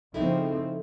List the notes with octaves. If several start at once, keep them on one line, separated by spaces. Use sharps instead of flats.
C#3 F3 C4 D#4 E4 A4